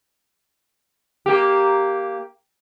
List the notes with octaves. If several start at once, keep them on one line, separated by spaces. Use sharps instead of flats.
A#3 G4